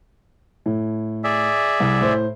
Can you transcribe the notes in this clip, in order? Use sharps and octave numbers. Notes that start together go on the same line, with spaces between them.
A2
G#4 D5 E5
C2
A2 C5